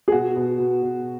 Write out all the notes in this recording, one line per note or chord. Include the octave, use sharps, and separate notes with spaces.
G#4
B2 F#4
B2
B2
B2